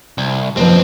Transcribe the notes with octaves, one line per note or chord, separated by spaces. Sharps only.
C2
F#1 D#2 F3 C4 B4